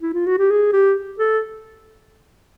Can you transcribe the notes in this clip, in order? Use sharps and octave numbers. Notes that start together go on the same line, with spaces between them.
E4
F4
F#4
G4
G#4
G4
A4